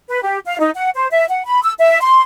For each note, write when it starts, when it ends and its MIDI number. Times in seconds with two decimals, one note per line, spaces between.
0.08 0.21 71
0.23 0.38 67
0.46 0.56 77
0.59 0.70 63
0.75 0.89 78
0.95 1.07 72
1.11 1.25 76
1.29 1.43 78
1.46 1.61 83
1.63 1.73 88
1.79 2.01 76
2.02 2.21 84